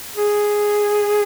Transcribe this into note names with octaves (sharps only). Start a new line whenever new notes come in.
G#4